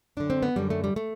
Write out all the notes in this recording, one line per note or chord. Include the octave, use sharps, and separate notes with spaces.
F#2 D3 D4
C4
B3
F#2 D3 G3
A3
G3
A3